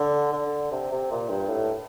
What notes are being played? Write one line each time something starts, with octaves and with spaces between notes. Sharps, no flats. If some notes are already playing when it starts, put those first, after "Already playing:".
Already playing: D3
D3
C3
C3
A#2
G2
A2